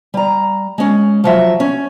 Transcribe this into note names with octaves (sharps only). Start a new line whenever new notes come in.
G3 A#5
G#3 C#4
F3 F#3 E5
C#4